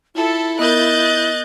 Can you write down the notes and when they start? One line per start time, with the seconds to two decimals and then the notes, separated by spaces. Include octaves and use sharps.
0.15 E4 F4 A4
0.59 B3 A#4 D#5 F#6 G6 A6